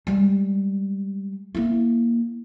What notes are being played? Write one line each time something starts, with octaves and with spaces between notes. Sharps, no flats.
G3 G#3
A#3 E4